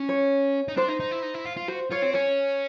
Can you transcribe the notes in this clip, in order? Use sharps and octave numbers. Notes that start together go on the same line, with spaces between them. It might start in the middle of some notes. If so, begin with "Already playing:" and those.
Already playing: C#4
C#5
D#4
D4 C5
D#4
D#4
E4
D#4
E4
F4
F4
F#4 C5
F4 C#5
C4
C#4 C#5